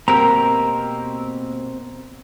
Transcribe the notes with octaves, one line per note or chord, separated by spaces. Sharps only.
B2 A#3 C4 G4 A#4 A#5 E6